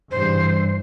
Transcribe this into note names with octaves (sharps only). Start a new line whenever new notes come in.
G2 C#3 E3 C5